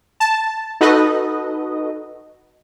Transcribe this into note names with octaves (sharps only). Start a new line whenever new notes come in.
A5
D#4 F#4 A4 B4 D#5